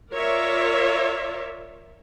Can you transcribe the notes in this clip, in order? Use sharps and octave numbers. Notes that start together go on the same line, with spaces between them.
F4 A#4 C#5 D5 E5